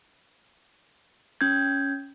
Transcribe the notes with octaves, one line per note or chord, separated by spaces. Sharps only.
C#4 G6 G#6